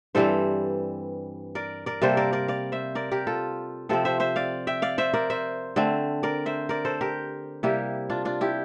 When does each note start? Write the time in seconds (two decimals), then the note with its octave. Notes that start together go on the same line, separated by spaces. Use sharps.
0.15 G2 E3 G3 C4 A4 C5
1.55 A#4 D5
1.86 A#4 D5
2.02 C3 G3 A#3 A4 C5
2.17 A#4 D5
2.33 A#4 D5
2.48 D5 F5
2.72 C5 E5
2.95 A#4 D5
3.11 G4 A#4
3.27 F4 A4
3.89 C3 F3 C4 A4 C5
4.05 C5 E5
4.20 C5 E5
4.36 D5 F5
4.67 E5 G5
4.82 D5 F5
4.98 C5 E5
5.13 A#4 D5
5.30 C5 E5
5.76 D3 A3 C4
6.23 A#4 D5
6.46 C5 E5
6.69 A#4 D5
6.85 A4 C5
7.01 G4 A#4
7.63 C3 G3 A#3 E4 G4
8.10 D4 F4
8.25 D4 F4
8.41 E4 G4